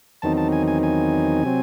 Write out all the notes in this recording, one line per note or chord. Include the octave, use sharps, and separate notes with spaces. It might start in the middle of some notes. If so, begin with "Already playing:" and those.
E2 D#3 F#3 C4 D#4 A5
A5
G#5
G#5
G#5
C3 F#3 C4